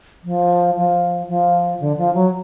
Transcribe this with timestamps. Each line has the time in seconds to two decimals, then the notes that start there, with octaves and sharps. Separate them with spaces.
0.24 F3
0.76 F3
1.28 F3
1.80 D3
1.97 F3
2.14 F#3